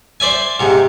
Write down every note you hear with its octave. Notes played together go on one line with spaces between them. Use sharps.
C5 D5 E5 G#5
G#2 C3